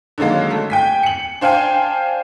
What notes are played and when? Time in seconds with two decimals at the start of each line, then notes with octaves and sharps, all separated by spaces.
0.18 D3 D#3 F#3 G#3 A#3
0.50 A3
0.70 G5 G#5 B6
1.03 C#7 F#7
1.41 D4 C5 F5 G5 G#5